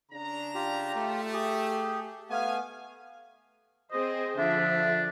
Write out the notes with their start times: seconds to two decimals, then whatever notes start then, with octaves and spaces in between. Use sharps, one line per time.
0.12 C#3 D4 A#5
0.55 F4 G4
0.95 A3
1.33 G4 G#4
2.30 A3 B3 F5 G#5
3.92 C4 G#4 C5 D#5
4.37 D3 F3 D4 E5